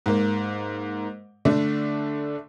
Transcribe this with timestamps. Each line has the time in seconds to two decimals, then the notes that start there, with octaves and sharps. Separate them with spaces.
0.06 G#2 A#3
1.45 D3 A3 D4